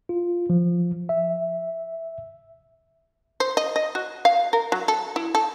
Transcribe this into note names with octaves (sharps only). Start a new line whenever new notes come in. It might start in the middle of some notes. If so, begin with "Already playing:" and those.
F4
F3
E5
C5
D#5
D#5
F#4
F5
A#4
F#3
A4
E4
A4